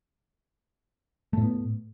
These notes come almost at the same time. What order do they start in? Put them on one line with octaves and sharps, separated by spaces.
A3 A2 B3